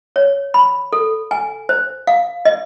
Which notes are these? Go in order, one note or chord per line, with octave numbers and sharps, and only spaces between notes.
C#5
B5
A4
G#5
C5
F5
D#5